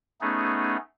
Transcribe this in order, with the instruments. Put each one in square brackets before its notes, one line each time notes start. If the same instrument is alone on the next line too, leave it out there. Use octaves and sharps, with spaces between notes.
[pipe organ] A3 B3 C#4 D#4 G#4